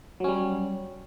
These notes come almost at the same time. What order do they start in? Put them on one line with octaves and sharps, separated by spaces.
F#3 C#4 G3